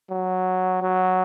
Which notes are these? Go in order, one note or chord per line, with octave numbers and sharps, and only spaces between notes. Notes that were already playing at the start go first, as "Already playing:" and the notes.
F#3
F#3